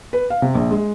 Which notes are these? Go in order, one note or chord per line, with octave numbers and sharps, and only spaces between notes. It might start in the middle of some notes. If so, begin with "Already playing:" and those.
B4
F5
C3
A#1
G#3